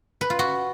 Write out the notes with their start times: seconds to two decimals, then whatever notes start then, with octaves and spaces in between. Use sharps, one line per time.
0.21 B4
0.30 F4
0.39 F#4